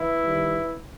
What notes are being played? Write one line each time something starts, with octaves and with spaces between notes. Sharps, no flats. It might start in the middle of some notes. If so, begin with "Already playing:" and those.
Already playing: E3 E4
D#3 G3